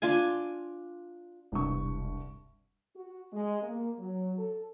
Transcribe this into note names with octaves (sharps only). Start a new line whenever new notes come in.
D4 F4 F5 G#5
E1 C2 G2 C#6
F#4
G#3
A#3
F#3
A4